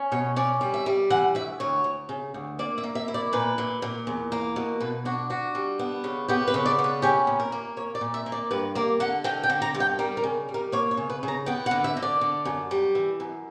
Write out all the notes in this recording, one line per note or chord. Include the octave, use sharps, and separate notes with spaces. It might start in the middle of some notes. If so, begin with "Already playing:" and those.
Already playing: C#4
B2 C#5
C#4 D5
G3
E5
G3
E3 F#5
D2 E5
D2 C#5
D2
C#3
D2
A#3 D5
E5
A#3
E5
E4
D5
A#2 B4
A#2
A#2
E2
A#3
B2
B2 B4
D4 F#4
D4 F#4
G3
B3
C#3
B3 G4
B4
C#3
D5
B3
B4
C#4 G4
A#2
A#4
A#3
A#2 C#5
D5
A#2
E5
A#3
D5
G2 B4
A#3 D5
D3 F#5
D3 G5
G5
D3
A#5
G2
G5
G3 A#4
A#4
C#3
G3
A#4
A#3 C#5
C#5
C#3
B4
C#3
A#5
B3 G5
F#5
D3
E5
D3
D5
D3
F#2
G3
E3
F#2